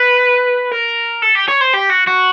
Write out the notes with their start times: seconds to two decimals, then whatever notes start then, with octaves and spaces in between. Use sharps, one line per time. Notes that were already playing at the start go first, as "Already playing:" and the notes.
Already playing: B4
0.72 A#4
1.22 A4
1.35 G4
1.49 C#5
1.61 C5
1.74 G4
1.90 F#4
2.07 F#4